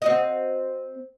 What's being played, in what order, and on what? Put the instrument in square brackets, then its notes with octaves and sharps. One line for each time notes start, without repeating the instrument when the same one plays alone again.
[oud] C4 F#4 D#5